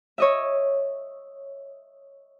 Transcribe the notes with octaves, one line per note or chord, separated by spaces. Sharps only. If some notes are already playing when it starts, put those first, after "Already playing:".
C#5 D#5 E5